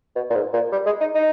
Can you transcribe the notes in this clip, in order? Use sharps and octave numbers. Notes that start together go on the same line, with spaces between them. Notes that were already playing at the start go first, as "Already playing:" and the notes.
B2
A#2
G#2
A#2
G3
G#3
D#4
D#4